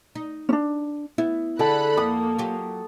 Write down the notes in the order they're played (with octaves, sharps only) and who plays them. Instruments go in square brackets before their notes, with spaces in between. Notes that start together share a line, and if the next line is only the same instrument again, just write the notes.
[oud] D#4
[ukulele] C#4 D4
[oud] B3 [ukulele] E4
[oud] D3 [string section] G#4 B5 F#6 [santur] A4 F#5
[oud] F2 [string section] A#3 [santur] D#6
[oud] F#3 F4 G4